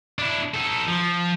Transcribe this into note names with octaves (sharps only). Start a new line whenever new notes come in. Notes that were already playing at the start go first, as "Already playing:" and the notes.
D4 E4
D#4 A4
F3